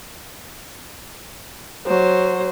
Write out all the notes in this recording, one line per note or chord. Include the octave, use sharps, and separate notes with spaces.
F#3 C5